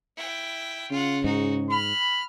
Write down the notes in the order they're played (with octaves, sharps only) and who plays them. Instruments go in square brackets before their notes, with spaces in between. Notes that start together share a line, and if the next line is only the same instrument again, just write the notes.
[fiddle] E4 G5
[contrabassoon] C#3 [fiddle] F4 F#5
[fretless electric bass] G#2 [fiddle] D#4 F#4
[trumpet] B5 [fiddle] F6